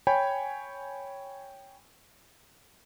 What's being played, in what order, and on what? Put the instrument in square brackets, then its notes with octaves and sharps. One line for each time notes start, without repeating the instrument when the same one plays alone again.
[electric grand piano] C#5 G5 G#5 B5